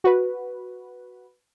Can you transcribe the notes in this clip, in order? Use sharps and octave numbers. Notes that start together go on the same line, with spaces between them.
F#4 B4